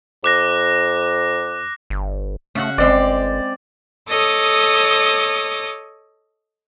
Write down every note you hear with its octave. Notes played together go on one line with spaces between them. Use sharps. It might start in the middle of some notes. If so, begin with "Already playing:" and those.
F2 D6 F#6 A#6
G1
C#3 A3 F#4 F#5
G1 G#3 C4 G4 D5
A4 C#5 D#5 D6 D#6